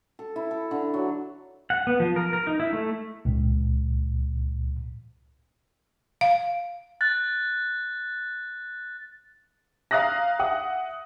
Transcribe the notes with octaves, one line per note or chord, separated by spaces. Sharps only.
A4
E4
A4
D3
F#3
F#5
B3
F3
A#4
A#4
D#4
E4
A3
C#2 A#2
F5
F#6 A6
F5 A#5 D#6 F#6 A#6
E5 F#5 D#6